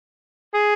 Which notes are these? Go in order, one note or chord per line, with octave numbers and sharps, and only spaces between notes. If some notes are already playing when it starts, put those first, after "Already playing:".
G#4